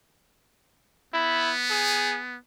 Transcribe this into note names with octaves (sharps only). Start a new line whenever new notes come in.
B3 E4
G#4